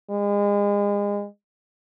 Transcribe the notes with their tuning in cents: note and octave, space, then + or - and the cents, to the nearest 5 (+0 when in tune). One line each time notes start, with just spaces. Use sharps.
G#3 -35